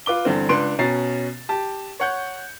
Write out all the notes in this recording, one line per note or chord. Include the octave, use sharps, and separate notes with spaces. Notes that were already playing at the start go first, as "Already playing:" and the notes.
F4 B4 D6 G7
E2 G2 D3 C4
C#2 D4 B4 C6 D7
B2 C#4 A#5 A6 C7
G4 A5
C#5 F#5 G6